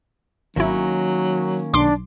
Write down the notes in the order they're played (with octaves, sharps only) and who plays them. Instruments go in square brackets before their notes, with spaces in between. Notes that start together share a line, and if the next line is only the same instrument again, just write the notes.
[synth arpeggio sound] G#1 E4 [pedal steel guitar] D#3 A#3 C#4 [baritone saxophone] F#3
[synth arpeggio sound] B1 C6 D6 [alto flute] D4